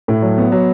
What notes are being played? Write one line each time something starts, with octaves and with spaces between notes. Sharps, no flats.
A2
F#3
B3
F#3